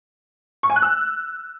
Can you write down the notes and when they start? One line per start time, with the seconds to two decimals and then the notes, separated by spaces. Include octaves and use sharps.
0.63 C#6
0.70 G#5
0.76 F#6
0.82 E6